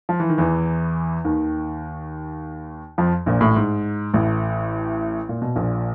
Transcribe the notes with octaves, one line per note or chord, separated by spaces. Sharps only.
F3
E3
D#3
E2 E3
D#2 D#3
F2 F3
A#1 A#2
A1 A2
G#2
A1 A2
A#2
B2
A#1 A#2